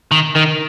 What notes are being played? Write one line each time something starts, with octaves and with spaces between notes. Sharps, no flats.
D#3
D#3